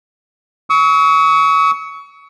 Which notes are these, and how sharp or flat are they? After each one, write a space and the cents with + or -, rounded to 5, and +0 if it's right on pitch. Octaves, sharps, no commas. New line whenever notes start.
C#6 +25 E6 -45